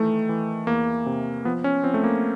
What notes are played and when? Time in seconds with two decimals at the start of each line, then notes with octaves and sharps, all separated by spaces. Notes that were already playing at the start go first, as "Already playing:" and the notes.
Already playing: D#3 E3 A3
0.29 E3
0.67 E2 A#3
1.06 C3
1.45 F3 B3
1.64 C#4
1.84 F3 C4
1.94 A3
2.04 A#3